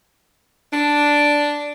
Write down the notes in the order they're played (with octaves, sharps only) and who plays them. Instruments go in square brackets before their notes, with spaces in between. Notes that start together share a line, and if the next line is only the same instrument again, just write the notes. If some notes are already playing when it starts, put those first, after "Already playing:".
[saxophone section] D4